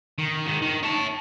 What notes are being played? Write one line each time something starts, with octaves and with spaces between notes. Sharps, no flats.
D#3
G#2 D#3
D#3
C#5 A5